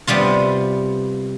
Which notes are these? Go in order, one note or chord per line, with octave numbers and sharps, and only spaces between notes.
C3 G3 B3 F4